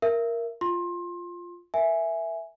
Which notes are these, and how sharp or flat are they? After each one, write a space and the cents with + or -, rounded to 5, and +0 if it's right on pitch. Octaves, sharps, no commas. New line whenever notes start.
A#4 +0 E5 +25
F4 +0 C6 +25
A#4 +0 E5 +0 G#5 +0